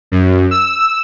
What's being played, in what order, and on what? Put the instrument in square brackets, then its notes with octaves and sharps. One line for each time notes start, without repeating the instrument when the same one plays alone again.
[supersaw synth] F#2
E6